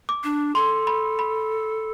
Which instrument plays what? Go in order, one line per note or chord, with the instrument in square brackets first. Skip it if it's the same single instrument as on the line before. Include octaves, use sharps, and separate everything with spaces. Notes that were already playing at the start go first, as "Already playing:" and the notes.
[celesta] D6
[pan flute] D4
[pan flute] A4 [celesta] C6
[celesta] B5
B5